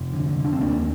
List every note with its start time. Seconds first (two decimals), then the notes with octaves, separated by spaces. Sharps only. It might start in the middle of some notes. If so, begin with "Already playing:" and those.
Already playing: F1
0.13 D3
0.36 F1
0.45 D4
0.53 C4
0.60 D#2 A#3 D4